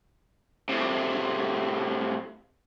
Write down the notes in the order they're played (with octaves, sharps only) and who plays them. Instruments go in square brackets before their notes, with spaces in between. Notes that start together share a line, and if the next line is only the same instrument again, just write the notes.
[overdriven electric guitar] A2 C3